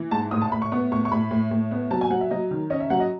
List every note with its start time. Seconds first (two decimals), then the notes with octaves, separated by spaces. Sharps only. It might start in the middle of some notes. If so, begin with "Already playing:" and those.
Already playing: E3
0.11 G#2 A5
0.31 A2 D#6
0.41 A5
0.52 A2 B5
0.62 C#6
0.72 B3 C#6
0.91 A2 C#6
1.05 C#6
1.11 A2 B5
1.31 A2
1.51 A2
1.71 B3
1.91 F#3 A5
2.01 G#5
2.10 F#3 F#5
2.21 E5
2.31 F#3 D#5
2.51 D#3
2.70 C#4 D#5
2.80 E5
2.90 F#3 F#5
3.00 D#5